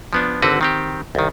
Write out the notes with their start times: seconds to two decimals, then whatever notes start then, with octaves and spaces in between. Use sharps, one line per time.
0.13 F3 B3 D4
0.42 G#1 D3 C4 F#4 B4
0.61 D#3 C4 G4
1.15 C2 D#3